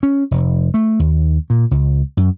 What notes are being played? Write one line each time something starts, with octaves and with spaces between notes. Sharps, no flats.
C#4
F1
A3
D#2
A#2
C#2
F#2